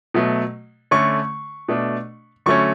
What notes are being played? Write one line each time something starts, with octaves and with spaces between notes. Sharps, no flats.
B2 F#3 A3
D3 A3 C#4 C#6
B2 A3 D4
D3 F#3 A3 C#4 C#6